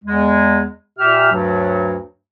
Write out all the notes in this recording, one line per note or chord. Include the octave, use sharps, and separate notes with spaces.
E2 G#3
A#2 G4 E5 F6
D2 G2 F#3